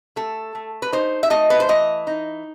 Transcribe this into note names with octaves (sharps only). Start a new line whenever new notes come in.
A3 A4
A3
B4
D#4 C5
E5
A3 D#5
B4
C5
E3 D#5
D#4